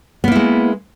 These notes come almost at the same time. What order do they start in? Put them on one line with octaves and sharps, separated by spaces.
B3 A#3 E4 G#3